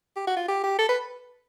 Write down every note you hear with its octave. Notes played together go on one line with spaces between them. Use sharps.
G4
F#4
F4
G4
G4
A4
B4